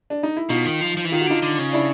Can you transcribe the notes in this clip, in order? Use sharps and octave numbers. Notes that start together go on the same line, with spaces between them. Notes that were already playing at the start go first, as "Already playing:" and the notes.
D4
D#4
E4
B2 D#4 F4
D#3
F3
F3
E3
D#3 F4
F#4
D3 D#4 F4
D3
C#3
D4 E4